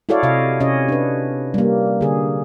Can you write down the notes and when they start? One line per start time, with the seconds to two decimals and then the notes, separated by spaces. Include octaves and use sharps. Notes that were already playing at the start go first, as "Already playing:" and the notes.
0.09 E4 F#4 A4 C#5 D5 F5
0.23 C3 D#5 F5
0.60 C3 C#4 C#5 D#5
0.89 D4 B4
1.54 G3 A#3
2.01 D3 G#4